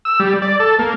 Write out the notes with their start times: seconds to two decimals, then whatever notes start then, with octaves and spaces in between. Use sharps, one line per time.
0.05 E6
0.20 G3
0.42 D5
0.60 A4
0.79 A#3